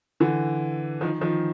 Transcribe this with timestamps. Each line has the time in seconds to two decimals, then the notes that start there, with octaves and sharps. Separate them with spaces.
0.20 D3 E3
1.01 D#3 F3
1.21 D#3 F3